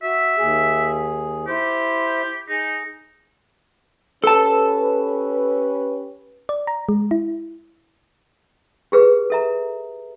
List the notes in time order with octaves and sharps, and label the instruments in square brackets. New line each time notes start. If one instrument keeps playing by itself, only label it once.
[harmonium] F#4 [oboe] E5
[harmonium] D#2 G#4
[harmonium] E4 C5 [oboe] G4
[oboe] D#4 [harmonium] G#4
[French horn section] C#4 G4 B4 [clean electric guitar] A4 A5
[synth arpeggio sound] D5
A#5
G#3
E4
[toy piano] G4 G#4 B4
A4 E5 A#5